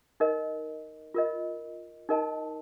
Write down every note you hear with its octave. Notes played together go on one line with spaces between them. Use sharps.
D#4 A#4 D#5
F4 A#4 D#5
D#4 A#4 D#5 A5